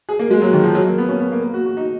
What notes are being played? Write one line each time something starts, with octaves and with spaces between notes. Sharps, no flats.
G#4
A#3
G#3
F#3
D#3
F3
F#3
A#3
B3
C#4
B3
A#3
A#3
F#4
F#4
D#4